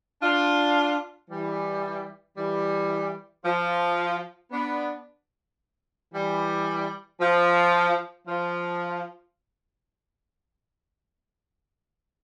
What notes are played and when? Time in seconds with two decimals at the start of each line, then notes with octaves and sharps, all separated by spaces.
0.22 D4 F4
1.30 E3 G3
2.37 E3 G3
3.45 F3
4.52 B3 D4
6.13 E3 G3
7.21 F3
8.28 F3